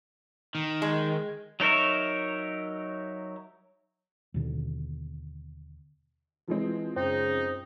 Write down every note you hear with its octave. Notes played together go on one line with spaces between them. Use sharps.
D#3
G#3
F#3 D#4 A#4 C#5 E5
D#2 B2 D3
E3 F3 G#3 C4
F#2 C#3 D#4 C5 G5